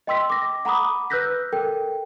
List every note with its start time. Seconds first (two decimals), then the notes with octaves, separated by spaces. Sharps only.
0.07 D#5 G5 C6 E6 B6
0.30 D6 A#6
0.65 F#5 A#5 B5 D6 D#6
1.10 B4 E6 F#6 G6 A#6 B6
1.52 A4 A#4 G5